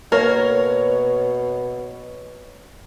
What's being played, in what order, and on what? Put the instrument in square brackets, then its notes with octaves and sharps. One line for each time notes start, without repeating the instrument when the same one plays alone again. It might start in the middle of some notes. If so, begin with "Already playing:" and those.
[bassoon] B2 [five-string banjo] A#3 A#4 [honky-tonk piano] C#5